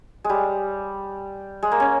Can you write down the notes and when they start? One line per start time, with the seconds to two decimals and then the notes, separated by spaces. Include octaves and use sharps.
0.24 G#3
0.29 G3
1.63 G#3
1.72 A#3
1.80 C#4